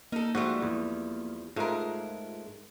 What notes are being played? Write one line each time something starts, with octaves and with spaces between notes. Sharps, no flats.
A#3 D#4 A4 F6
G#2 F3 G3 A3 F#4
E2
G#2 G#3 A3 F4 A#4